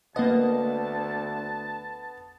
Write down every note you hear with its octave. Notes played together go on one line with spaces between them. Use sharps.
D2 A#3 B3 D#5 A5